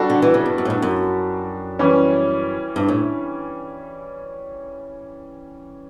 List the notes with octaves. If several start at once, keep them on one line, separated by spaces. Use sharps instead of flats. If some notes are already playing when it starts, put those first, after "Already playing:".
Already playing: G3 D4 F#4 A4
D3
E3
C#3
G2
F#2
A2
G2
F#2
E3 G3 C#4
G2
A2